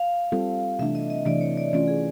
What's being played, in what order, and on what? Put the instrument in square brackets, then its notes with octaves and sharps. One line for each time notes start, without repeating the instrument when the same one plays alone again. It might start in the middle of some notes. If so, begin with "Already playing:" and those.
Already playing: [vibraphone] F5
[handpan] G3 C4 F4 A4
[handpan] C3 E3 A3 D4 [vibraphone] E5
[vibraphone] D#5
D#5
[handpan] C3 E3 A3 D4 [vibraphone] D5
[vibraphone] C#5
D5
[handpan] E3 A3 C#4 F4 [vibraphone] D5
[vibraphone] G#4